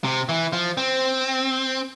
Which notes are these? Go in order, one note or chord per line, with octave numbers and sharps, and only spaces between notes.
C3
E3
F3
C4